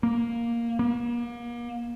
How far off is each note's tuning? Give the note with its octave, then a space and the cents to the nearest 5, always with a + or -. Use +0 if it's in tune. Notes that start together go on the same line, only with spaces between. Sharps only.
A#3 +5
A#3 +40